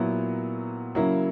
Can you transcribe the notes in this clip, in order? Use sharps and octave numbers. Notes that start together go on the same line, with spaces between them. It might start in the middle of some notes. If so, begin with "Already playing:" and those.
Already playing: A#2 F#3 B3 E4
C#3 F#3 A#3 E4